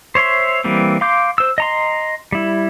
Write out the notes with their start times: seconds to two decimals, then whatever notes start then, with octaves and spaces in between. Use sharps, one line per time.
0.15 C5 C#5 E5 C6
0.64 E3 G3 A#3 C4
1.01 F5 C6 D6 G6
1.38 C5 E6
1.58 D#5 A#5 C6
2.32 G3 E4